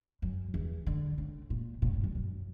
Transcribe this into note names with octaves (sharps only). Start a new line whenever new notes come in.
F#2
E2
D3
C#3
A#2
A#2
G2
F#2
F#2